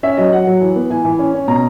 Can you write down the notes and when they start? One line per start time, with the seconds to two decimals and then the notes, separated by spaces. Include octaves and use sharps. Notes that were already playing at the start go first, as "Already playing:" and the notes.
0.03 C#4 E5
0.17 F#3 D#5
0.32 F#3 F#5
0.47 F#3
0.61 E3
0.76 B3
0.90 E3 G#5
1.05 E3
1.19 C#4
1.34 C#4
1.48 B2 A#5